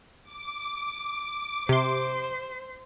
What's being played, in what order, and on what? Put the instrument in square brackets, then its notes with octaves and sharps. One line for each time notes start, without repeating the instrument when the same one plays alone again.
[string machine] D6
[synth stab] C3 C6 [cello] C5